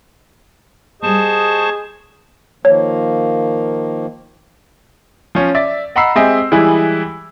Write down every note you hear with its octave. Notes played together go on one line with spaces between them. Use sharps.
G3 A#3 G#4 C5 D#5 A5 C#6
D#3 F3 A#3 C#5
F3 C#4
D5 E5 A6
D#5 F#5 A#5 B5 E6 C7
G#3 C4 G4 D#5 E5 G#5
E3 G3 G#3 E4 G#4